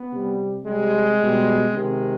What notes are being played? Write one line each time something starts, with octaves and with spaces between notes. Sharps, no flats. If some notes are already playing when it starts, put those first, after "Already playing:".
Already playing: B3
C3 G3
C3 G3 G#3
B2 G3
C3 D#3 G#3